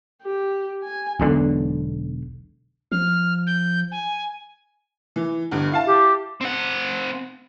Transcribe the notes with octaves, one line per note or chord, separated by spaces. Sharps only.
G4
G#5
E1 B1 D3
F3 F6
G6
G#5
E3
G1 G2
E4 F5 A5
G4
C4 F#5